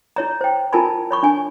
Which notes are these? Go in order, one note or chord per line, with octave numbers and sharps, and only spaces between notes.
E4 C#5 A#5
C5 G5
E4 F4 A#4 G#5 A5 B5
C#5 B5 C#6
D4 G#5